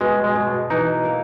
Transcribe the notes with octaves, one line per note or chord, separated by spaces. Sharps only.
B2 G#3
G#3
B2
E3 D#4
A#3